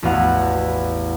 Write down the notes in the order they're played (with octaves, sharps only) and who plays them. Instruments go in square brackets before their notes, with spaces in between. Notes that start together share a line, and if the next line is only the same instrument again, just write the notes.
[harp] A1 E2 B3 F#4 F5 F#5